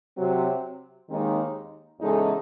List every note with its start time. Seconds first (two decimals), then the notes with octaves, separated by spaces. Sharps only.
0.18 C3 F#3 C4
1.09 D#2 D#3 G#3 C4 D#4
2.00 E2 C#3 G#3 D#4 A4